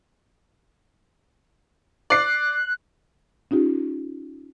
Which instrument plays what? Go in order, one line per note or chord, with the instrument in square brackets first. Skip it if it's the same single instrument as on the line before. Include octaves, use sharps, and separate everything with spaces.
[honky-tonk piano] D5 C7 [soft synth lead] F#6
[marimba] C#4 D#4 F4 G4